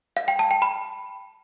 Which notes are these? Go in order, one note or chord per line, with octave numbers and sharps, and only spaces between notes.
F5
G5
A5
G5
B5